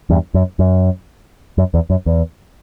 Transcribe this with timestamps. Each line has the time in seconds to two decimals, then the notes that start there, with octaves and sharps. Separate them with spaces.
0.10 E2 G2
0.34 F#2
0.59 F#2
1.58 F#2
1.74 E2
1.90 F#2
2.06 E2